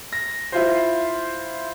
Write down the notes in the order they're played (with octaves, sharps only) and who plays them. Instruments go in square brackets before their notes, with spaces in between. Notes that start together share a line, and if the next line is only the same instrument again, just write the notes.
[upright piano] A#6
E4 F4 C5